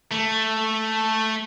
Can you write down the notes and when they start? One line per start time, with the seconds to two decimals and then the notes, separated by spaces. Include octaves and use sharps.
0.12 A3